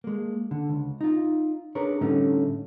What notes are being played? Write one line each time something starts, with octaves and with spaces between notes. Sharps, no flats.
G#3 A#3
D3
C#2
D#4 F4
D4 G#4 A#4 B4 C#5
A2 D3 G3 A3 C#4 D#4